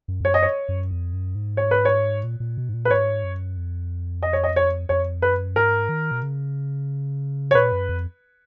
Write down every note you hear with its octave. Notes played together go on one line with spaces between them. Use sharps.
F#2
F2
F#2 C#5
D#5
C#5
F#2
F2
F#2
G#2
C#5
B4
C#5
A#2
A#2
B2
G#2
A#2
B4
G#2 C#5
F#2
F2
D#5
C#5
D#5
C#5
F2 C#5
F#2 B4
G#2 A#4
D#3
B2
C#3
C#5
A#2 B4
F#2
F2